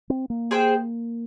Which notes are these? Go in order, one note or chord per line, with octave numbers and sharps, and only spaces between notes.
C4
A#3
G#4 C5 G5